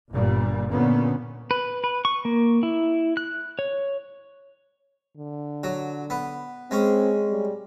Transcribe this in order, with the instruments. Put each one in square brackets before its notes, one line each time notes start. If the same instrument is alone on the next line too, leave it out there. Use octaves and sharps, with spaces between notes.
[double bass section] G1 G2 A#2 G3
A#2 D3 B3 C#4
[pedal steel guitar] B4
B4
C#6
A#3
E4
F#6
C#5
[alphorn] D3
[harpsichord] F#3
B3
[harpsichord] G#3 C#4 [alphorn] C4
[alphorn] G3